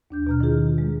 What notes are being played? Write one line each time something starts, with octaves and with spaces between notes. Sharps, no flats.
D#2 D4 G6
B2 A#5 F6
D#3 E4 F4 G#4
D#3 G#3